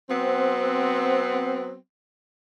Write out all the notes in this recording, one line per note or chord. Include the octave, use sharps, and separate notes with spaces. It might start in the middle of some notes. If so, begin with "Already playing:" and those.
F#3 B3 C4